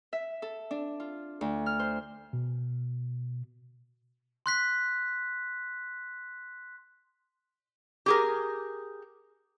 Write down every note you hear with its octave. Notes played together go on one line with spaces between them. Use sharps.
E5
A4
D4
F4
D2
F6
C5
B2
C6 F#6 B6
G4 G#4 A#4